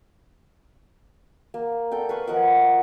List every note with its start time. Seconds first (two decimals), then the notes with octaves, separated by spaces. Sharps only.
1.54 A#3
1.91 A4 D5 G5
2.09 B4 F5 G#5 C#6
2.27 F3 A#4 D#5 F#5